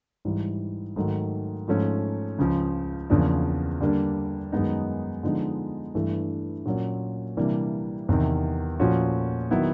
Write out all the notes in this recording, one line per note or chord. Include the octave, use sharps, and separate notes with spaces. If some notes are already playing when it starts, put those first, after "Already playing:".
G#2 E3 G3
G#2 D#3 F#3 A3
G#2 F3 A3 C#4
C#2 C#3 F3
E2 C#3 F3 A#3 D4
D3 G3 A#3 D4
F#2 D#3 G#3 B3 D#4
D3 F3 G#3 B3 D#4
G2 E3 A3
A#2 F#3 A#3 C#4
C3 E3 G3 A#3 D4
E2 C3 D#3
A#2 F3 A3 C#4 F#4
D#3 F#3 B3 E4